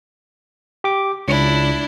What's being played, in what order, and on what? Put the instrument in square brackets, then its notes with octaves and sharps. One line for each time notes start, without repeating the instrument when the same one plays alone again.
[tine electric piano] G4 D6
[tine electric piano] C#2 [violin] D4 E4